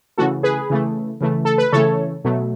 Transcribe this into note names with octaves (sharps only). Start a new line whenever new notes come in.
C#3 E3 A3 F#4 A4
G#4 B4
C#3 E3 A3
C#3 E3 A3
A4
B4
C#3 E3 A3 A4 C#5
B2 F#3 A3